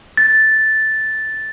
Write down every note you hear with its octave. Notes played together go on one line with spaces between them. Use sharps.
A6